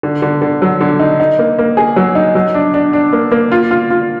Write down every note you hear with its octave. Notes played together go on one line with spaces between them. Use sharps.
D3
D3
D3
F#3
D3
D#4
D#4
A#3
A#3
G#4
F#3
D#4
F#3
D4
D4
D4
A#3
A#3
F4
F4
F4